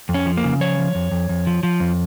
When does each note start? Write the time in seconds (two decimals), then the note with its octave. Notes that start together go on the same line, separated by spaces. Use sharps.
0.09 F2
0.14 C#4
0.26 F3
0.37 A#3
0.44 C#3
0.60 F3 C#5
0.78 F3
0.95 F2
1.12 F2
1.29 F2
1.47 F3
1.63 F3
1.80 F2